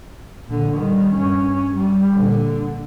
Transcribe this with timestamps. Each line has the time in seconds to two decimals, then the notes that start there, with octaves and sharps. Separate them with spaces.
0.47 A#2 D3
0.77 D#3 G3
1.15 G2 C#4
1.76 G3
2.14 A#2 D3